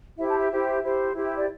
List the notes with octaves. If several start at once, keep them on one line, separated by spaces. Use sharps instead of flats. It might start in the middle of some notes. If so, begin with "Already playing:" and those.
E4 G4 C5 E5
A5
E5
E4 G4 C5
E4 G4 C5
E4 G4 C5
E5
D5